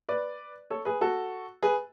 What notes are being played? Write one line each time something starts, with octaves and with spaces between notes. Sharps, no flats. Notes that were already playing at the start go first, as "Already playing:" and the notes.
B4 D5
A4 C#5
G#4 B4
F#4 A4
G#4 B4